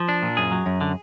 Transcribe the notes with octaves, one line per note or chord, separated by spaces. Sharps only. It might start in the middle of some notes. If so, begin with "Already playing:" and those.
Already playing: F3
D4
A#2
F#2 G#4
F#3
F#2
D3